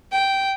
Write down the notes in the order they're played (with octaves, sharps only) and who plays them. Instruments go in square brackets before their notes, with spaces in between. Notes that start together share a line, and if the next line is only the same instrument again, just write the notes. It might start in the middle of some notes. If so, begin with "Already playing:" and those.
[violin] G5